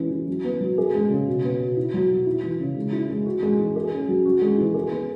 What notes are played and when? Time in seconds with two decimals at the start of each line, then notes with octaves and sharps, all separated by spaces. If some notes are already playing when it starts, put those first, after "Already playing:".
Already playing: E3 G#3 C#4
0.11 E3
0.28 F#3
0.44 B3
0.61 F#3
0.78 G#4
0.94 G#3
1.10 C#3
1.27 B2
1.44 B3
1.60 B2
1.77 E4
1.94 F#3
2.10 B2
2.26 E4
2.43 E3
2.60 C#3
2.76 G#3
2.92 E4
3.10 G#3
3.26 F#4
3.42 G#3
3.59 E3
3.76 G#4
3.92 C#4
4.08 F#3
4.25 F#4
4.42 G#3
4.58 E3
4.74 G#4
4.91 B3